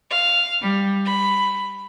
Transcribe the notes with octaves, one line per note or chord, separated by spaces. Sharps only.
F5
G3
B5